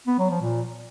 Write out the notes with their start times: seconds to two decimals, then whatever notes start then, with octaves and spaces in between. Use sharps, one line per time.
0.07 B3
0.19 F#3
0.30 F3
0.42 A#2